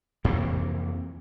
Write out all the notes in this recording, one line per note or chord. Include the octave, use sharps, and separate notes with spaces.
F2 C3 E3 A#3